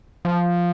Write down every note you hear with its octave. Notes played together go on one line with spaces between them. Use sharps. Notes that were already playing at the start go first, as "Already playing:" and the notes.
F3